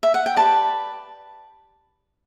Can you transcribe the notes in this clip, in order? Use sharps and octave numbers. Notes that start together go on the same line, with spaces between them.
E5
F#5
G5
G4 B4 D5 A5